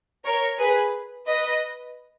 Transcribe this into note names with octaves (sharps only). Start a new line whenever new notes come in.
A#4 C#5
G#4 B4
B4 D#5